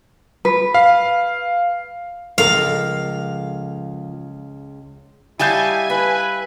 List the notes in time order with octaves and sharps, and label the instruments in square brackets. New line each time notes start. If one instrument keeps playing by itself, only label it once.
[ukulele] B4
[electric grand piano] F5
[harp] C#2 [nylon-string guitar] F3 A4 A#4 [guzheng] F5
[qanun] G3 D#5 C#6 [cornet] E4 [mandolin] F5 A5 G6 [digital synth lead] G#5
[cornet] B4 [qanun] E5